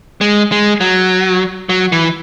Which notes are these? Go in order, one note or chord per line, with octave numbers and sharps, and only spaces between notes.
G#3
G#3
F#3
F#3
E3